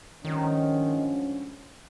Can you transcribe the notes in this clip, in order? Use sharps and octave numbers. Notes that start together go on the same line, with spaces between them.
G2 D3 D#3 F3 G#3 C#4